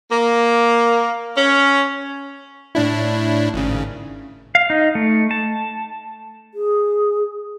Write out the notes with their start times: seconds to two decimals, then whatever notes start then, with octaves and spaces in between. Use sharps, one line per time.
0.11 A#3
1.36 C#4
2.75 A2 D4 E4
3.54 G#1 C#3
4.55 F5
4.70 D#4
4.95 A3
5.31 A5
6.54 G#4